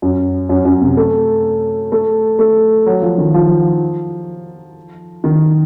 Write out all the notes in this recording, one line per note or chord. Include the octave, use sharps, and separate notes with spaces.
F#2
F#2
F#2
C3
A3
A3
A3
F#3
F3
D#3
F3
D#3